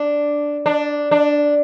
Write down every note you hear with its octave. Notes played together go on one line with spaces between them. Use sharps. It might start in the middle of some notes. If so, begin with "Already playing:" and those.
Already playing: D4
D4
D4